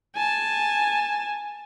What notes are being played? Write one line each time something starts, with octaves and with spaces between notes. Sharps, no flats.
G#5 A5